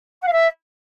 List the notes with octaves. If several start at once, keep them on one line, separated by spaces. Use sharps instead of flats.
F#5
F5
E5